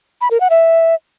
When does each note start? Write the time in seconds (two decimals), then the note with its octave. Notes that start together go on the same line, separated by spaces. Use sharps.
0.21 B5
0.31 A#4
0.40 F#5
0.50 E5